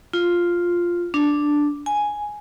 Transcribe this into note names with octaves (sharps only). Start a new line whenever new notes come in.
F4
D4
G#5